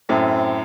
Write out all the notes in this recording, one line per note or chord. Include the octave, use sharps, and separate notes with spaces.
F#2 A2 C4
C4